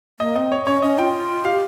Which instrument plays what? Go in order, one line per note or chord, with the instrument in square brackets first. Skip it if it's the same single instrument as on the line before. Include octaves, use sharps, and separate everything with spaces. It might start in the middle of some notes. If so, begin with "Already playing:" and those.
[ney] A#3 [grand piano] D#5
[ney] C4 [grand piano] D#5
[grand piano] C#5
[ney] C#4 [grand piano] C#5
[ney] C#4 [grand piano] D#5
[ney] F4 [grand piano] G5
[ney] G4 [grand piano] F5